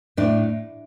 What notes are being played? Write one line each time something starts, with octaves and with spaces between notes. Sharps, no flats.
A2 D4